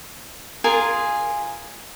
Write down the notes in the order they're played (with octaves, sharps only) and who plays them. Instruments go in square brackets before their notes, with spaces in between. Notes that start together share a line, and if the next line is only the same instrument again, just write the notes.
[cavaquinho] F4 G#4 A#4 G#5